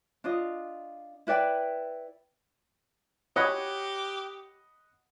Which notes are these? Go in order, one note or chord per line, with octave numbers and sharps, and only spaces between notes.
D4 F4 D#5
E4 B4 D5 G5
G4 C#5 D#5 F#5 B5